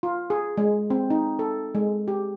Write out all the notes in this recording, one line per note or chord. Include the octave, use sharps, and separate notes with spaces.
F4
G#4
G#3
C4
D#4
A4
G#3
G4